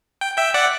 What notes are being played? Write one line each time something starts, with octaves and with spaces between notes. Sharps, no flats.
G5
E5 G5
D5 F#5